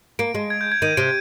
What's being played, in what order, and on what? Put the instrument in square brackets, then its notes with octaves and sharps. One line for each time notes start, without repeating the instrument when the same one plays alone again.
[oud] A#3 [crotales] D7
[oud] G#3
[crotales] G#6
G6
G#6
[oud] D#3 [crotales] D#7
[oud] C3 [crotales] D7